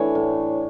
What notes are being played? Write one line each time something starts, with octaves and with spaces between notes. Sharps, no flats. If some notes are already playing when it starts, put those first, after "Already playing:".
Already playing: E3 A3 D4 C#5
A2